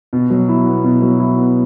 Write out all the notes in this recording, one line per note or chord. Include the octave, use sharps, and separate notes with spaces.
B2
F#3
E4
B3
B2
F#3
E4
B3